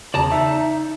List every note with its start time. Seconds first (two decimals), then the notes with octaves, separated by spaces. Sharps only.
0.14 E2 C#3 D5 A5 A#5
0.32 D#4 E5